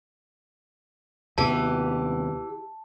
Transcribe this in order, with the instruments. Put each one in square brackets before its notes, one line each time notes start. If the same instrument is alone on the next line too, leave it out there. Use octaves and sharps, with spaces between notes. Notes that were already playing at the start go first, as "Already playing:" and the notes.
[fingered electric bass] D#2 C3 B3 [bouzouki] E3 G4 [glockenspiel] A5